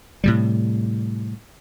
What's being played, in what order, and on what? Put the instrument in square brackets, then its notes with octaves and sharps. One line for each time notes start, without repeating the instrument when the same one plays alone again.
[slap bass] A2 C3 G3